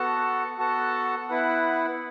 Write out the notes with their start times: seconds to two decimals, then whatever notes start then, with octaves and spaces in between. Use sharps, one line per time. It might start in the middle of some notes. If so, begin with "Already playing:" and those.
Already playing: B3 F#4 A4 F#5 A5
0.58 B3 F#4 A4 F#5 A5
1.29 B3 E4 B4 F#5